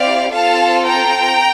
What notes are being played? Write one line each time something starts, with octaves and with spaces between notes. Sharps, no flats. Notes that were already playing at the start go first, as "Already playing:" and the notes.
Already playing: C4 E4 G4 D5 F5
C4 F4 A4 F5 A5
G5 A#5